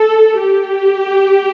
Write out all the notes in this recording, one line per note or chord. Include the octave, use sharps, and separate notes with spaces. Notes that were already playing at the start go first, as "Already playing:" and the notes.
Already playing: A4
G4